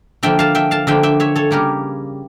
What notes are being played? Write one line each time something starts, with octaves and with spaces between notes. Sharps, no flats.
D3 F3 A#3 E5 G5
F5 A5
E5 G5
F5 A5
D3 F3 A#3 E5 G5
E5 G5
C#5 E5
A4 C#5
C#3 G3 A#3 G4 A#4